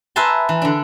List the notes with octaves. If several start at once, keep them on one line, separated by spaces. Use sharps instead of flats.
A#4 B4 E5 G#5 A5 C6
E3
D3 D4